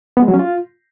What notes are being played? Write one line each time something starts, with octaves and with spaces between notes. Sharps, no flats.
B3
G#3
F#3
C#4
F4